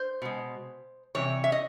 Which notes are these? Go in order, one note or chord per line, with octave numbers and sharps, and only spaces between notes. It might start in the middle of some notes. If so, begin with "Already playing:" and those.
Already playing: C5
B2 G#3
C3 E3 G3 C#5
E5
D#5